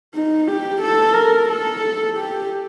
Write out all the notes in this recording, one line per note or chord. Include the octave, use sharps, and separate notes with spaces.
D#4
G4
A4
A#4
A4
G4